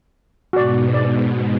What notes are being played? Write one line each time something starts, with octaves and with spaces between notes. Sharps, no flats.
G#2 B2 F#4 D5
D5